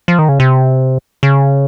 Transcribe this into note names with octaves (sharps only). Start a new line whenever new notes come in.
F3
D#3
C#3
C3
C#3